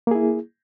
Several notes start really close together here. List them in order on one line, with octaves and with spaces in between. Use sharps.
A#3 G#4 E4